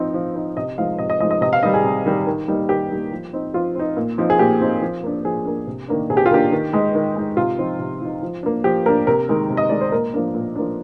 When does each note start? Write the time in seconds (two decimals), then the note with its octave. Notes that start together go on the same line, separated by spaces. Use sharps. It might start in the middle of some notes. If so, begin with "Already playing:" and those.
Already playing: F3 C4 D#4
0.14 F3
0.35 C4 D#4
0.57 C3 D#5
0.78 F3 G#3 D#4 F5
0.99 C3 D#5
1.10 D#5
1.20 F3 G#3 D#4 D#5
1.31 D#5
1.41 C3 D#5
1.53 F5
1.63 D#3 G3 D#5
1.74 G#4
1.84 C3
2.06 D#3 G3
2.27 D#3
2.48 G3 A#3 D#4
2.69 D#3 G4
2.90 G3 A#3 D#4
3.12 F3
3.33 C4 D#4
3.54 F3 F4
3.75 C4 D#4
3.97 A#2
4.18 F3 C4 D#4
4.30 G#4
4.39 A#2 G4
4.60 F3 C4 D#4
4.82 F3
5.03 A#3 D4
5.25 F3 G#4
5.45 A#3 D4
5.67 C3
5.88 D#3 A#3 D4
6.10 C3 G#4
6.17 G4
6.26 F4
6.31 D#3 A#3 D4 G4
6.52 D#3
6.73 G#3 D#4
6.95 D#3
7.16 G#3 D#4
7.37 C3 F4
7.58 F3 C4 D#4
7.79 C3
8.01 F3 C4 D#4
8.23 F3
8.43 A#3 D4
8.64 F3 G4
8.86 A#3 D4 A#4
9.07 C3 A#4
9.29 D#3 G#3 D#4
9.50 C3
9.57 D#5
9.69 D#3 G#3 D#4 D5
9.81 C5
9.92 A#2 A#4
10.14 F3 A#3 D4
10.35 A#2
10.56 F3 A#3 D4